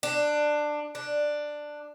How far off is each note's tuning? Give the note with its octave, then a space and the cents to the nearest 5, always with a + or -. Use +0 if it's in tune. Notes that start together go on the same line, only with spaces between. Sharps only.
D4 +15
D4 +10